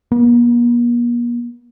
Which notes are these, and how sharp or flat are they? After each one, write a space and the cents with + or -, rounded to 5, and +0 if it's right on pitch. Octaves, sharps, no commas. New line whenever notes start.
A#3 +45